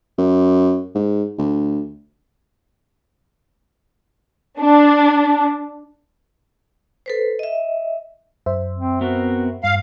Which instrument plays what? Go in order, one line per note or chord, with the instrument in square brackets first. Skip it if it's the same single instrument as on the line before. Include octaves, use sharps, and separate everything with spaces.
[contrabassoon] F#2
G#2
D2
[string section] D4
[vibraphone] A4 B4 C5
D#5 E5
[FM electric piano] F#2 C5 E5
[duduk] C4
[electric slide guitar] B3 C4 A#4 [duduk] F#4
[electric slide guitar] G2 [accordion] F5